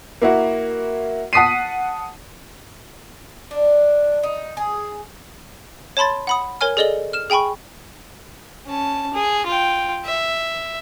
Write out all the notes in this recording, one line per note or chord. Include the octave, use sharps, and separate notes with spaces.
A#3 E4 F#4
F#5 A5 D#6 B6 C7 D#7
D4
D#4
G#4
C#5 A5 B5 C6 A6
F#5 B5 D#6
A#4 C#5 G#5 F6
G#4 A4 D5 D#5 F#7 G7
F6 E7
G#4 G5 G#5 B5 C#6
C#4 A5
G#4
F4 G5
E5